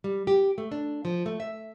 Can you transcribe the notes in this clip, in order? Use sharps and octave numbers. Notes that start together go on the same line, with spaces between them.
G3
G4
A3
D4
F3
A3
E5